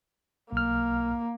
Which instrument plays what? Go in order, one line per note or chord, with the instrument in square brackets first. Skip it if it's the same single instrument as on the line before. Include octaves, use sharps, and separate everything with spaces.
[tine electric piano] B1 F6 [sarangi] A#3